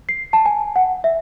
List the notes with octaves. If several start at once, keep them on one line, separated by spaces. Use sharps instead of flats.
C7
A5
G#5
F#5
E5